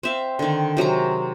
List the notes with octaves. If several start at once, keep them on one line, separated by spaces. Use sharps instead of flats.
C4 E5 F5
D3 D#3
C3 F#3 G#3 A#5